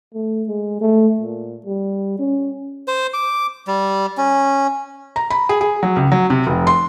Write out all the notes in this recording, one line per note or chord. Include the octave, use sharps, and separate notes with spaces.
A3
G#3
A3
A#2
G3
C#4
C5
D6
G3
C#4
A#5
B5
G#4
G#4
F#3
C#2
F#3
C3
F1
C6